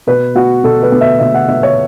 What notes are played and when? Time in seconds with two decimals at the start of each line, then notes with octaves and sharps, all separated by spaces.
0.07 B2 B4
0.35 B3 F#4
0.64 B2 A4
0.83 B4
0.92 B3
1.01 E5
1.20 B2 E5
1.34 F#5
1.48 B3 E5
1.63 C#5